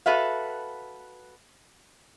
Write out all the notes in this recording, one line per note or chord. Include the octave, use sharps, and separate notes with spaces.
F#4 A4 B4 E5 F5